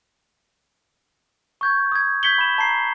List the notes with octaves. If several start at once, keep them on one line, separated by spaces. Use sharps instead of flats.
C#6 G6 G#6
D#6 G#6
G6 G#6 B6 C#7 F#7 G7
B5 E7
A5 A#5 C7